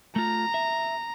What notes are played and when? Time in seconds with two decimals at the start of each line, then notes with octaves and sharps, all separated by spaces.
0.16 A3 F4 A#5
0.54 E5